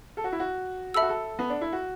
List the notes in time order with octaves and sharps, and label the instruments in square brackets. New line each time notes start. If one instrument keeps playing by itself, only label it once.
[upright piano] A4
F#4
E4
F#4
[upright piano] A4 [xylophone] E5 B5 E6
[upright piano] F#4
A4
B3
D4
E4
F#4